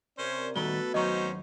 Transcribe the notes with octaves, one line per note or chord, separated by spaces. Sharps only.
C3 C#4 A#4 C5 D5
D#3 G3 A3 B3 F#4 A4 B4 G7
D#2 F#3 C#4 D#4 C5 D#5 F#5 C#6